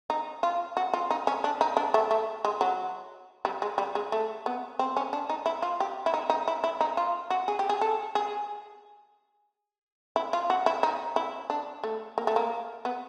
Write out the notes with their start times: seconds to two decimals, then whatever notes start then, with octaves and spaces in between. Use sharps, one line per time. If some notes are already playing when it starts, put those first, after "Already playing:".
0.10 D#4
0.43 F4
0.77 F#4
0.94 F4
1.11 D#4
1.27 C#4
1.44 D4
1.61 D#4
1.77 D4
1.94 A3
2.11 A3
2.45 G#3
2.61 F#3
3.45 G3
3.62 G#3
3.78 G3
3.95 G#3
4.12 A3
4.46 B3
4.79 C4
4.97 C#4
5.13 D4
5.30 D#4
5.46 E4
5.62 F4
5.80 G4
6.06 E4
6.14 D#4
6.30 D#4
6.48 E4
6.64 E4
6.81 D#4
6.97 F4
7.30 F#4
7.48 G#4
7.59 G4
7.69 G#4
7.81 A4
8.15 G#4
10.16 E4
10.33 F4
10.50 F#4
10.66 E4
10.83 D#4
11.16 E4
11.50 D4
11.84 A3
12.18 A#3
12.27 A3
12.36 A#3
12.85 B3